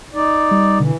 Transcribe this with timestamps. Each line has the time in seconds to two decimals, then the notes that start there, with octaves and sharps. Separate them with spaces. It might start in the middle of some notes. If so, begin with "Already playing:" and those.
0.14 D#4 D5
0.51 G3
0.80 B2 D3 E3